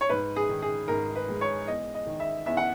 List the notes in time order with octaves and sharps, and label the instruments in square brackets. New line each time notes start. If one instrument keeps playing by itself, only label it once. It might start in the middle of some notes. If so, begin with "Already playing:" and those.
[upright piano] C#5
G#2 B4
G#4
D#3
G#4
G#2 A#4
B4
G#3
C#5
E2 D#5
D#5
D#3
E5
E2 E5
F#5